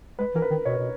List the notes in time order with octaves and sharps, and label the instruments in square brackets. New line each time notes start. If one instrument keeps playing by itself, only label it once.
[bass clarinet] G#3 [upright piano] B4
[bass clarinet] E3 [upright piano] A#4
[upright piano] B4
[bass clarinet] D#3
[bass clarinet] B2 [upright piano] C#5
[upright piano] B4
[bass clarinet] B2